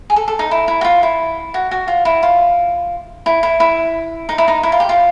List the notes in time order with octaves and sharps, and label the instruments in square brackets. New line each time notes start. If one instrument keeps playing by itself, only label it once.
[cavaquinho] G#4
A4
A4
D#4
E4
E4
F#4
F4
E4
F#4
F#4
F4
E4
F4
E4
E4
E4
D#4
E4
D#4
E4
F4
G4
F4